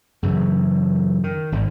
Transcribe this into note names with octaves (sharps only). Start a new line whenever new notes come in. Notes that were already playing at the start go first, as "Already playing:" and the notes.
F#2 C#3 E3
D#3
G#1 G#2